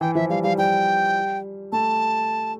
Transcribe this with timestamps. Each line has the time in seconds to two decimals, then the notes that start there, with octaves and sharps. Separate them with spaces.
0.01 E3 G5
0.15 F3 E5
0.30 G3 F5
0.43 G3 F5
0.58 G3 G5
1.72 A3 A5